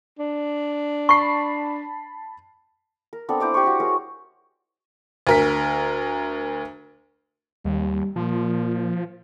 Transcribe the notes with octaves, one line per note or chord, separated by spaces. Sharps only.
D4
A5 B5 C#6 C7
A#4
B3 C4 D4 A4
E4 C5 D5 A#5
G4 C5 D5 C#6
F#4
G#4 A#4 C#5
D2 A#4 B6
D#2 G3
A#2 F3